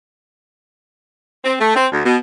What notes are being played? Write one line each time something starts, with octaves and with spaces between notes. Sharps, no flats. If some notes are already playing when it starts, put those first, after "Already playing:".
C4
A3
C4
D2
B2